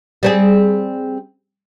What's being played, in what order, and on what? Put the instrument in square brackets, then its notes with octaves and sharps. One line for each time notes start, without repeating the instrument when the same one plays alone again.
[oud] G3 C4 G#4